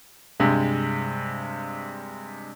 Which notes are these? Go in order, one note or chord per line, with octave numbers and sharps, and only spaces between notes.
G2 C3 G#3